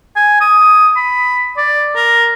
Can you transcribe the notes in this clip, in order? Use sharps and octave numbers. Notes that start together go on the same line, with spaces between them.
G#5
D#6
B5
D5
A#4